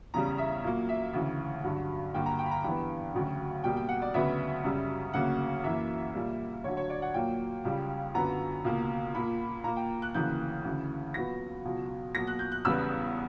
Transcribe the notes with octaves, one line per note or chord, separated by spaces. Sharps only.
E2 C#3 G3 A#5
E5
A#2 F#3 A#3
E5
D2 C#3 E3
G2 D3 F#3
G2 D3 A#3 G5
A#5
G5
B5
A#5
G2 E3 B3 G5
D2 C#3 F#3
B2 G3 A#3 G5
G5
F#5
D5
D2 C#3 F#3 B3 E5
F#2 C#3 G3
D2 C#3 F#3 A#3 F#5
F#2 E3 A#3 E5
A#2 G3 A#3
D2 D3 F#3 C#5
C#5
D5
F#5
A#2 F#3 A#3 G5
C#2 C#3 G3
F#2 D3 F#3 B3 A#5
C#2 B2 A#3
A#2 A#3 B5
A#2 A#3 A#5
G5
F#6
D2 C#3 E3 A#3 G6
D2 C#3 E3
A#2 F#3 B3 A#6
C#2 B2 F#3
B2 F#3 A#3 A#6
F#6
G6
F#6
E2 C#3 G3 B3 E6